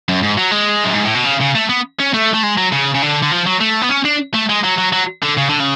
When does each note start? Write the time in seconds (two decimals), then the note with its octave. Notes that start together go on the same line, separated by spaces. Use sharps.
0.09 F#2
0.23 G#2
0.38 F#3
0.51 G#3
0.84 F#2
0.94 G#2
1.04 A2
1.15 B2
1.25 C#3
1.41 C#3
1.55 A3
1.69 B3
2.00 C#4
2.14 A3
2.34 A3
2.43 G#3
2.58 F#3
2.72 C#3
2.94 C#3
3.03 D3
3.23 D3
3.32 F3
3.47 F#3
3.61 A3
3.82 B3
3.89 C#4
4.05 D4
4.34 A3
4.49 G#3
4.64 F#3
4.78 F#3
4.93 F#3
5.23 D3
5.37 C#3
5.49 D3
5.60 C#3